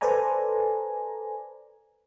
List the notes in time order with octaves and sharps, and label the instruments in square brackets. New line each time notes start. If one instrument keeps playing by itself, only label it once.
[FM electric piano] A4 B4 C5 D5 G#5 A#5